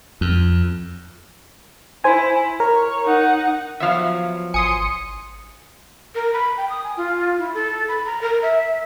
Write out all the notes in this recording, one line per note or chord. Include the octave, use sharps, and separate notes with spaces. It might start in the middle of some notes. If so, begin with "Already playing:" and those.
F2
E4 C5 G#5
A#4 C#5
D#4 F#5
E2 F3 F#3 E5 F5
G#1 G#5 C6 D#6 C#7
A#4
B5
G5
D#6
G#5
F4
E4
A4
B5
A#5
A#4
E5